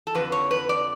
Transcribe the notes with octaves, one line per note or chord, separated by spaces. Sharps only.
A4
F2 D3 B4
C#5
B4
D5